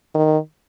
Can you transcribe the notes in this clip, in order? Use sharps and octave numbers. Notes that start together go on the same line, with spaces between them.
D#3